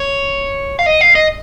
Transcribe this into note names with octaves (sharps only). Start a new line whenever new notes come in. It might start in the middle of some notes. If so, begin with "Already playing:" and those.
Already playing: C#5
F5
D#5
F5
D#5